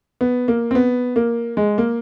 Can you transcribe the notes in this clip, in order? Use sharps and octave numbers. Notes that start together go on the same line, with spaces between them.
B3
A#3
C4
B3
A#3
G#3
A#3